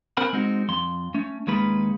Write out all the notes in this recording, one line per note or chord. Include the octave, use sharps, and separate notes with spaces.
C4 A#4 C5 F#5 G#5 B5
G#3 C4 D#4 F#4
F2 C6
A3 C#4
D#2 D#3 G#3 C#4 B4 B5